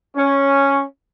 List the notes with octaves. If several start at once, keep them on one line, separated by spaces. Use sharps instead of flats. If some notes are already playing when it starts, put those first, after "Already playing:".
C#4